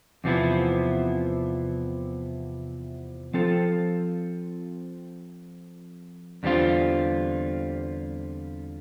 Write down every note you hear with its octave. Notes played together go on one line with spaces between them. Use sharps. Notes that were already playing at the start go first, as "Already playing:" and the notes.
E2 C3 F3 B3 E4
F3 C4 F4 A4
E2 D3 G3 C4 F4